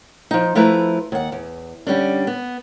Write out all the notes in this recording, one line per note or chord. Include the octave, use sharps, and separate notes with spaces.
F3 D#4
F3 A3 E4 B4 A#5
D#2 F#5
E2
D3 G3 C#4 D4
B3